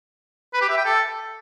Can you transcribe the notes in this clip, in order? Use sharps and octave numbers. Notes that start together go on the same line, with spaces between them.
B4
G4
E5
G5
A4